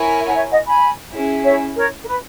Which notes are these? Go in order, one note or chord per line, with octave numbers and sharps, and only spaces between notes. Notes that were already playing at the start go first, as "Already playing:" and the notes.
Already playing: E4 A#4 C#5 G#5
E5
F#5
C#5 E5
D#5 F#5
G#5 B5
C#4 E4 G#4
C#5 E5
A#4 C#5
A#4
B4